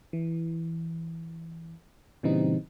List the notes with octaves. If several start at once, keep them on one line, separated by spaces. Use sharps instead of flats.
E3
A#2 C#3 E3 G3 C4 D#4